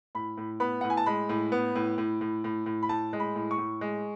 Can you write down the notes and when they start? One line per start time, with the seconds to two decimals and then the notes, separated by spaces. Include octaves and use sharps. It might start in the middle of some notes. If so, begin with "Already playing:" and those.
0.15 A2 B5
0.38 A2
0.60 B3 B5
0.81 A2 F#5
0.90 G#5
0.97 A5
1.06 G#3 B5
1.29 A2
1.52 B3
1.75 A2
1.98 A2
2.21 A2
2.44 A2
2.66 A2
2.83 B5
2.89 A2 A5
3.13 G#3
3.20 B5
3.36 A2
3.51 C#6
3.58 A2
3.81 G#3